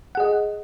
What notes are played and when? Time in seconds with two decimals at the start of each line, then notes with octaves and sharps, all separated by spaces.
0.15 F#5
0.17 G#4
0.20 D#5